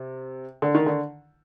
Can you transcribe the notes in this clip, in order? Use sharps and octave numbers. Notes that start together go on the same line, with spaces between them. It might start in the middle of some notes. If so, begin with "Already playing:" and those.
Already playing: C3
D3
D#3
D3